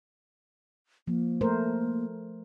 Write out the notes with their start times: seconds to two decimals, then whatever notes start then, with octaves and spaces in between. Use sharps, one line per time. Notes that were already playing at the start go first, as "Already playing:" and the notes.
1.07 F3 A#3
1.41 A3 A#4 C5